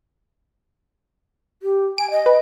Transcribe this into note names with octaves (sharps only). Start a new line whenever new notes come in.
G4
G#5 D7
D#5
B4